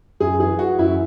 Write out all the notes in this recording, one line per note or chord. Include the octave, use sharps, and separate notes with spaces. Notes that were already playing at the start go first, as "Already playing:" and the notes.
F#2 G#4
E3 G#4
E3 F#4
F#2 E4